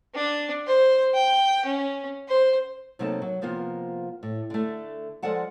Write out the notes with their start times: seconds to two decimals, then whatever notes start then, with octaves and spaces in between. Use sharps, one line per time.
0.15 D4
0.67 C5
1.14 G5
1.66 C#4
2.29 C5
2.99 C3 F#3 A3 A#3 D#4 A5
3.22 F#3
3.41 C3 F3 A#3 B3 F4
4.23 A2
4.50 D3 A3
5.23 F3 G#3 A4 D5 F#5 A5